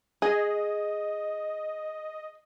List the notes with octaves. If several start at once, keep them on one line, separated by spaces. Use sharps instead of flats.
G#4 D#5